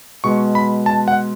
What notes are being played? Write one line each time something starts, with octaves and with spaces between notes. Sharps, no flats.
B2 G#3 C#6
B5
A5
F#5